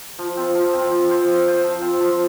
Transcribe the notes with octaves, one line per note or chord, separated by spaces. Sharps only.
F3
C4 F4
F3
C4 F4
C4
F4 C5
C4
F4 C5
F3
C4 F4
F3